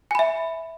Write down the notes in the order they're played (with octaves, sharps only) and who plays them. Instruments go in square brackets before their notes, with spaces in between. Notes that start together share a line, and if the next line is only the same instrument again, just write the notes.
[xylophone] G#5
B5
E5